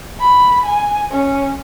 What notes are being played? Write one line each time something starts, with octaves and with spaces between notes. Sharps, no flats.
B5
G#5
C#4